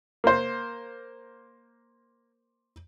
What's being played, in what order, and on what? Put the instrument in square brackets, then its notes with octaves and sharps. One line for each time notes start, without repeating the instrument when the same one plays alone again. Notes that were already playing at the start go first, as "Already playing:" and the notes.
[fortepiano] A#3 C5